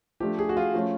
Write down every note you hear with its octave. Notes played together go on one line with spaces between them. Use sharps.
F3 A3 D4 G4
G#4
F#4
F4
F3 A3 C#4